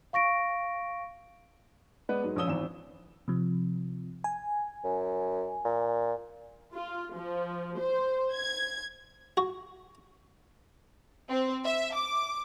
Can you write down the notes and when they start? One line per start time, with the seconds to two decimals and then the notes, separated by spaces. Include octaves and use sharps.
0.13 F5 C#6 A#6 D7
2.09 G#3 B3 B4 D5
2.23 G#2 F#3 G#3
2.36 A#1 F3 C#4 D#6 E6 G7
2.47 G#1 E2 E7
3.28 C3 F3
4.24 G#5
4.84 F#2
5.65 A#2
6.73 F4
7.15 F3
7.79 C5
8.34 G#6
9.37 F#4
11.29 C4
11.65 E5
11.95 D6